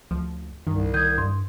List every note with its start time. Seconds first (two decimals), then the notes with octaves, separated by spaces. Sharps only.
0.11 D2 F3
0.67 C2 G2 D#3
0.94 D#3 D#6 G6 G#6
1.18 G2 C6